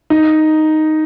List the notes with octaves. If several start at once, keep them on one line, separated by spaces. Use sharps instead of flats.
D#4